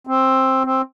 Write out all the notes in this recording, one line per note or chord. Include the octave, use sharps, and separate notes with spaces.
C4
C4